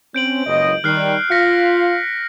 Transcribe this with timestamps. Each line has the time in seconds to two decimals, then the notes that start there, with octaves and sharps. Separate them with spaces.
0.14 C4 C#4 G6 D7 F#7
0.47 F#1 C#2 D#5
0.84 D#3 G3 F6 F#6 C7
1.31 F4 F5 A#6 B6 C#7